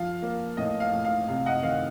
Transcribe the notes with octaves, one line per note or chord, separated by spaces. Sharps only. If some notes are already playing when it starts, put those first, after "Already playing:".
Already playing: F3 F5
A#3
A2 D#5
F5
A2
F5
C3 F5
D#5 F#5
D#3 F5